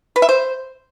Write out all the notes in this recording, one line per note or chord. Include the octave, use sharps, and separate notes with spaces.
B4
E5
C5